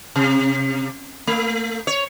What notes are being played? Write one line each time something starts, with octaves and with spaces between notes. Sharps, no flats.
C3
A3
C#5